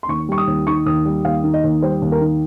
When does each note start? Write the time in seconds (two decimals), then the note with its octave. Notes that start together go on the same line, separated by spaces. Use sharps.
0.03 C6
0.08 D#2 C#6
0.29 G3 C#6
0.38 D#6
0.47 D#2
0.67 D#3 C#6
0.86 D#2 D#6
1.05 G3
1.25 D#2 F5
1.44 D#3
1.54 D#5
1.64 D#2
1.82 G3 C5
2.02 D#2
2.12 A#4
2.21 D#3